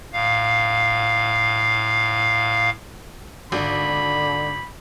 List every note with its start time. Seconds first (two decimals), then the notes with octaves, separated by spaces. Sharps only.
0.13 A2 F5
3.52 G#1 D3 B5